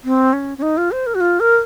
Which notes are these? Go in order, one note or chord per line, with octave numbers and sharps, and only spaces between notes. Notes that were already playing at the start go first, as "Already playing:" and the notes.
C4
C#4
C#4
D#4
F4
C5
A#4
F#4
F4
A#4